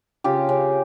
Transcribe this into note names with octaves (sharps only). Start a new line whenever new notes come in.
C#3 F4 G4
C#3